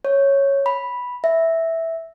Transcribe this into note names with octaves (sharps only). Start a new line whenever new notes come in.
C#5
B5
E5